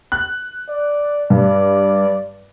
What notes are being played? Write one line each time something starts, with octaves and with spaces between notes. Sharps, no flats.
F#6
D5
G2 D5